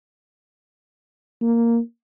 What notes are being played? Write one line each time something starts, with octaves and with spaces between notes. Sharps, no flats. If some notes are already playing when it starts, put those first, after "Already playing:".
A#3